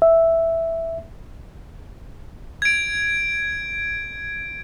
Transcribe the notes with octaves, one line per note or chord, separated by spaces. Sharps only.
E5
G#6 D7